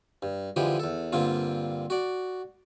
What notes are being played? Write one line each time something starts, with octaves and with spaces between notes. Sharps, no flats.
G2
D3 E3 F3 G#3 G4
E2 A4
G2 D3 A#3 C4 F4
F#4 D5